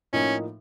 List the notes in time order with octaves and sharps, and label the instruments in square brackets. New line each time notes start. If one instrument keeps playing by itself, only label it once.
[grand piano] A2 F3 A#3 D#4 [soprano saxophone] C#4